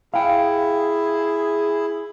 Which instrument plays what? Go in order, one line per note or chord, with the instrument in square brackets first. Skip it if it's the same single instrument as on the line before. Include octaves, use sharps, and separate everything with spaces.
[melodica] E4 [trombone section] G#4 [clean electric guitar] F5 G5